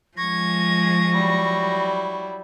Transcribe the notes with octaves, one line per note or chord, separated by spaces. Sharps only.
F3 G#3 C#6 G#6 A#6
F#3 G3 E4